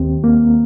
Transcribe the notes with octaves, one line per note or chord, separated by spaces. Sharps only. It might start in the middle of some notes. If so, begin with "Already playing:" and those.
Already playing: D#2 C4
A#3